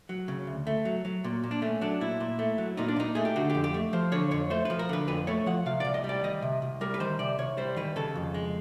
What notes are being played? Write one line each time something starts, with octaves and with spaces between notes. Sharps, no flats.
F#3
C#3
D2
A3
F#3
F#3
A#2
A#2
D4
A3 C#4
F#3 D4
A#2 E4
A#2
A3
F#3
A#2 D#4
D4
A#2 D#4
A3 G#4
G4
D3 F#4
G4
F2
G4
A3
F3 C5
D3 C#5
F2 C#5
A3 C5
F3 B4
A#4
D3 B4
F2 B4
A3 C#5
F3 F#5
C3 F5
C2 D5
D#5
G3
D5
D#3 D#5
C3
C2
G3 A#4
B4
D#3 C5
C3 D5
C2 C#5
G3 C5
D#3 B4
C#3 A4
F2
G#3